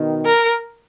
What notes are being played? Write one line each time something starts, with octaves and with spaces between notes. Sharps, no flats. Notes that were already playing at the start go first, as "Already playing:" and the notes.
Already playing: B2 D#3
A#4